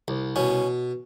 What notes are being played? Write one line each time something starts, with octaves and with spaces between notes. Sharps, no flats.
C2
B2 C#4